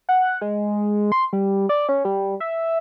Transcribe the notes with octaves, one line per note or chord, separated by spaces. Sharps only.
F#5
G#3
C6
G3
D5
C#4
G3
E5